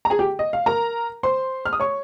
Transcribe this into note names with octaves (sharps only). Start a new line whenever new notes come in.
A#5
G#4 G#5
G4 G5
D#5
F5
A#4 A#5
C5 C6
F6
D#6
C#5 C#6